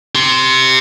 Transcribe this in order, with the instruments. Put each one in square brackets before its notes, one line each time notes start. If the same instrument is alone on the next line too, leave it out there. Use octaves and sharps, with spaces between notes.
[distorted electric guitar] G4 C6